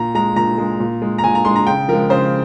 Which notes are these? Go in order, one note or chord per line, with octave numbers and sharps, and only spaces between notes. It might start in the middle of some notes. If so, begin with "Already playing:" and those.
Already playing: A#2 A#5
G#3 A#5
A#2 A#5
G#3
A#2
G#3
A#5
A#2 G#5
A#5
G#3 C6
A#5
C#3 G5
F3 G#3 A#4
C#3 C5